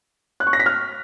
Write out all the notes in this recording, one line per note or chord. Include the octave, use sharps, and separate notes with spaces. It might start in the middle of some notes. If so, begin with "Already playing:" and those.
F#6
C#6
A#6
B6
F6